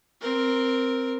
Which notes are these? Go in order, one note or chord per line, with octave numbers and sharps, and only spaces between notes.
C4 A#4